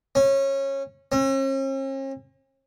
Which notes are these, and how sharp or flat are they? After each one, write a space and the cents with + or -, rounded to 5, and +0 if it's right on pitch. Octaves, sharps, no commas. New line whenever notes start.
C#4 -20
C#4 -45